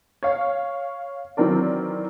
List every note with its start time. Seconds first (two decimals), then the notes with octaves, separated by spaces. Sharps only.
0.23 C#5 F5
1.37 D#3 E3 F#3 C4 A#4 D5